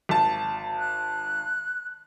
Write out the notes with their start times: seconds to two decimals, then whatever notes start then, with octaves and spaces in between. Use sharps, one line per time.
0.09 G#1 A5
0.78 F#6